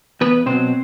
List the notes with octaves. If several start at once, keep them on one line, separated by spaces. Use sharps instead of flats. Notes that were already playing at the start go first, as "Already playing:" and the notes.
E2 B3 B4
B2 F#3 C4 C5